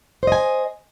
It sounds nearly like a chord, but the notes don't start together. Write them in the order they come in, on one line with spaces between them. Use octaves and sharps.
C5 D#5 G#5